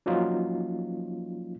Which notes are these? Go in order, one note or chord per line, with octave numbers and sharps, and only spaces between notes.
F3 F#3 A#3 C#4 D#4 F4